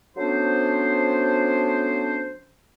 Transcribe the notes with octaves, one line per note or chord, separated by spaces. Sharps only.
F#3 A3 B3 C#4 D4 C5